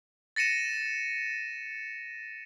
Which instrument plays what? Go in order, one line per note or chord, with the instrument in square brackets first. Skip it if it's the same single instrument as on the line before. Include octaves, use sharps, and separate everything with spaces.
[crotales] A6 A#6 C#7 D#7 E7